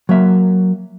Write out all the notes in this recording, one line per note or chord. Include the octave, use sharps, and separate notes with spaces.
F#3 A#3 E5